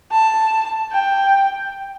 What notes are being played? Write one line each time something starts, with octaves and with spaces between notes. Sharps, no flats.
A5
G5